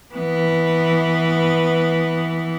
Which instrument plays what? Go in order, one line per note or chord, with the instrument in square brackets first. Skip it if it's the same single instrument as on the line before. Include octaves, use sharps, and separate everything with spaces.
[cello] E3 B3